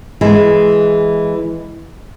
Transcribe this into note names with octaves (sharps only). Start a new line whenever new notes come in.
E3 G#3